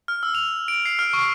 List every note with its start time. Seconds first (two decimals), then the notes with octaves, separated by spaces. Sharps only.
0.08 F6
0.23 E6
0.35 F7
0.68 D7
0.86 C7
0.99 F6
1.13 C#6